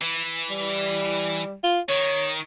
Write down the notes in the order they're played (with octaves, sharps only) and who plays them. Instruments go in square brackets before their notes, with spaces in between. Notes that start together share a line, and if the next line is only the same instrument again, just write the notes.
[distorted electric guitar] E3
[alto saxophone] G3
F4
[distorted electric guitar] D#3 [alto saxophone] C#5